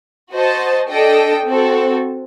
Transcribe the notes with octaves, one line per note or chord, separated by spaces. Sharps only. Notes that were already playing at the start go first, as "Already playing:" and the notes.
F#4 C5 D#5 A5
D4 A4 D#5 G5
C4 F#4 A4